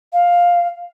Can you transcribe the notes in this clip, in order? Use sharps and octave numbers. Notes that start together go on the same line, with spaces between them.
F5